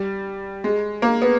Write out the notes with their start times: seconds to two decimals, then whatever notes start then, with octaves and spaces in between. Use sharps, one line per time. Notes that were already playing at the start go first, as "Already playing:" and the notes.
Already playing: G3
0.64 G#3
1.02 A#3
1.22 B3